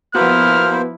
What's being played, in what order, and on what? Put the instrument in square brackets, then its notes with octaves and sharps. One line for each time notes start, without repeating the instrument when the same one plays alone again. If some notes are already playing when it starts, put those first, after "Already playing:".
[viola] F3 E4 [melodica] A#3 C5 [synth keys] B3 F#4 B4 [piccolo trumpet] F6